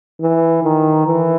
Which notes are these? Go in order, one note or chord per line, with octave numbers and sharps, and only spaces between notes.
E3
D#3
E3